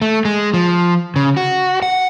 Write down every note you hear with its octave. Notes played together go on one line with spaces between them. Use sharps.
A3
G#3
F3
C#3
F#4
F#5